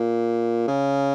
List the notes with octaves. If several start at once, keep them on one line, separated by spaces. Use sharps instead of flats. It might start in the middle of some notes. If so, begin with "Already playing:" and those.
Already playing: A#2
C#3